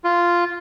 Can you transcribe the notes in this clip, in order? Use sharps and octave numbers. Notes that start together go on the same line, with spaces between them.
F4